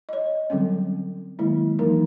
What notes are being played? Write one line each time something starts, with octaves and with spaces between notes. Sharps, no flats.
C#5 D#5
D3 F#3 G3 C4 C#4
D#3 F#3 G#3 A#3 E4
E3 F#3 A#3 D#4 A#4